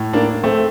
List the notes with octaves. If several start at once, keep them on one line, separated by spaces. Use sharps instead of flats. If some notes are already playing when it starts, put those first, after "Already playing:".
Already playing: A2
A#3 D4
A3 C4